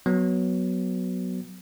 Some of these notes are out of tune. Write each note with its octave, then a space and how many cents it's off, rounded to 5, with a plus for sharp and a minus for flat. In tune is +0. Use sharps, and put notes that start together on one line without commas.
F#3 +0 B3 -5